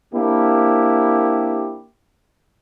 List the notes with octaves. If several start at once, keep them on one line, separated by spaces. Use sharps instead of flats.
A#3 C4 D4 E4 G4